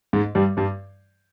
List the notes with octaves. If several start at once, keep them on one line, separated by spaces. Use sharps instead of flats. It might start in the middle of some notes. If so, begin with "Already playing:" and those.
G#2 G#3
G2 G3
G2 G3